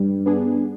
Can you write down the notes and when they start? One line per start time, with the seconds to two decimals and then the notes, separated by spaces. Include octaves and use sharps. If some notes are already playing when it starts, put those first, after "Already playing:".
Already playing: G2 G3
0.26 B3 D4 G#4